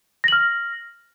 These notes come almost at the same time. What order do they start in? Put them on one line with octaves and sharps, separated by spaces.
A#6 F#7 F6